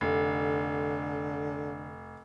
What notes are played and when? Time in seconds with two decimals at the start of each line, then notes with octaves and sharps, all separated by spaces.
0.01 F1 D3